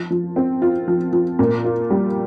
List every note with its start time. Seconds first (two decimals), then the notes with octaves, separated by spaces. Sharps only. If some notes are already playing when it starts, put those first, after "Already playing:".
Already playing: F3
0.10 F3
0.36 C4
0.62 F4
0.88 F3
1.13 F3
1.39 A#2
1.65 F4
1.90 G3